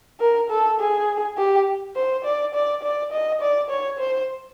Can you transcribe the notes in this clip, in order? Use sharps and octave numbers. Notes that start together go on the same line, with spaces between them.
A#4
A4
G#4
G4
C5
D5
D5
D5
D#5
D5
C#5
C5